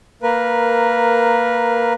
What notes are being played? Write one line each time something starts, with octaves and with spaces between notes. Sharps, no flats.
A#3 A#4 B4